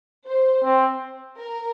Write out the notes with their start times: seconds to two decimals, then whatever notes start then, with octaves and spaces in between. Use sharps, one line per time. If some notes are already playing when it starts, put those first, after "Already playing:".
0.27 C5
0.63 C4
1.37 A#4